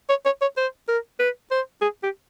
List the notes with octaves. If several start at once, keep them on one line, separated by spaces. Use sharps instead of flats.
C#5
C#5
C#5
C5
A#4
B4
C5
G#4
G4